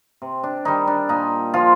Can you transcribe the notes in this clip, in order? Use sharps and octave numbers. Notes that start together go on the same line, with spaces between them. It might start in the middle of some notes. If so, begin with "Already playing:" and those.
C3
D4
D#3 G3 D#4
D4
A#2 D#4
F3 F4